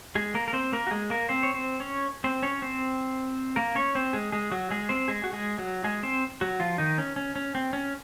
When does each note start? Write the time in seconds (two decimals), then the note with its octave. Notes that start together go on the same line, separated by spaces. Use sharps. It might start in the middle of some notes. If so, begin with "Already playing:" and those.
0.15 G#3 G#4
0.34 A#3 A#4
0.48 A#4
0.53 C4 C5
0.72 A#3 A#4
0.87 F#4
0.91 G#3 G#4
1.10 A#3 A#4
1.29 C4 C5
1.43 C#5
1.54 C4 C5
1.80 C#4 C#5
2.24 C4 C5
2.42 C#4 C#5
2.62 C4 C5
3.56 A#3 A#4
3.75 C#4 C#5
3.95 C4 C5
4.13 G#3 G#4
4.32 G#3 G#4
4.51 F#3 F#4
4.71 G#3 G#4
4.89 C4 C5
5.08 G#3 G#4
5.24 F#4
5.33 G#3 G#4
5.58 F#3 F#4
5.84 G#3 G#4
6.03 C4 C5
6.41 F#3 F#4
6.60 F3 F4
6.78 D#3 D#4
6.98 C#4
7.16 C#4
7.36 C#4
7.55 C4
7.73 C#4